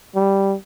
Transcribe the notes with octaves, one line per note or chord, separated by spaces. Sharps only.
G3